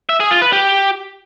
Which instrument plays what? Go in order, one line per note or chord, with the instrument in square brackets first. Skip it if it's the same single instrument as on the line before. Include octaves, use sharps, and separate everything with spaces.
[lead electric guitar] E5
G#4
F4
B4
G4